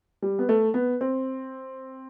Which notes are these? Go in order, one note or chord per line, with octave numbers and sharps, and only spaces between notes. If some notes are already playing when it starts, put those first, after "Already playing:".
G3
B3
A3
B3
C4